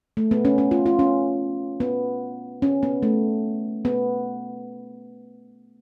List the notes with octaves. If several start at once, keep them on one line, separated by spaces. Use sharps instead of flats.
A3
B3
C#4
C#4
F4
F4
C#4
B3
C#4
B3
A3
B3